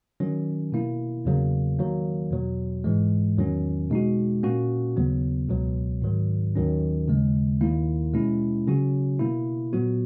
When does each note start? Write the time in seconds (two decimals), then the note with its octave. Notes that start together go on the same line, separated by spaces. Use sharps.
0.20 D#3 F#3 C#4
0.72 B2 A#3 E4
1.25 E2 C#3 F#3 A#3
1.79 D#3 F#3 A#3
2.31 E2 B2 F#3
2.84 G#2 E3 G#3
3.37 E2 D#3 F#3 C#4
3.90 B2 G#3 D#4 F#4
4.43 A#2 A#3 C#4 F#4
4.96 D#2 C#3 F#3 B3
5.49 C#2 B2 F#3
6.02 G#2 D#3 F#3
6.55 D#2 D#3 F#3 C#4
7.08 D#2 C#3 G#3
7.61 D#2 D#3 A#3 E4
8.14 B2 G#3 C#4 E4
8.67 C#3 F#3 C#4 F#4
9.19 B2 A#3 E4
9.73 A#2 F#3 B3 F#4